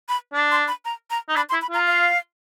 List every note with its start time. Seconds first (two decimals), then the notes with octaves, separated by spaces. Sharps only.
0.09 B5
0.34 D4
0.51 C6
0.68 B5
0.85 A#5
1.10 A#5
1.29 D#4
1.36 D4 B5
1.49 C6
1.53 E4
1.62 B5
1.71 F4 A#5
1.87 F5